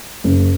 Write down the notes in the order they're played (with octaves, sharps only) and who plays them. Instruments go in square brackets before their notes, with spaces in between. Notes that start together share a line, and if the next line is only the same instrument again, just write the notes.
[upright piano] F#1